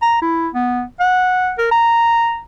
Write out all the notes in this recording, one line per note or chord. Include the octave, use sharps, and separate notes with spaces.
A#5
E4
B3
F#5
A#4
A#5